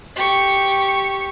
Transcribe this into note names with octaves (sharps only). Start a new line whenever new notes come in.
G4 C#6